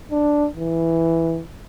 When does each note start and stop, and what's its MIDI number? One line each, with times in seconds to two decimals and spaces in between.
0.11 0.48 62
0.56 1.42 52